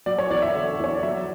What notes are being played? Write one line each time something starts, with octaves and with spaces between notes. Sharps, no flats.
F#3 D5
C#5
E2 D5
E5
D3
E2 C#5
D5
F#3 E5